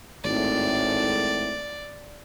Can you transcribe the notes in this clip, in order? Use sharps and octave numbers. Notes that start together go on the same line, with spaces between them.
G#1 A2 D5